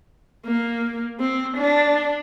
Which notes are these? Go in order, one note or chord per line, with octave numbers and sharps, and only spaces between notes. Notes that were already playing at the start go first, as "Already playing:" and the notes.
A#3
C4
D4